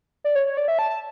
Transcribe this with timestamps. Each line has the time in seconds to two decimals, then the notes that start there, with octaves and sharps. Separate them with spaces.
0.24 D5
0.35 C#5
0.46 C#5
0.57 D5
0.68 E5
0.79 A5
0.90 A5